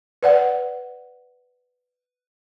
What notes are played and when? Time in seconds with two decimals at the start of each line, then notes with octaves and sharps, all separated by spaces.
0.23 B4 D5 F#5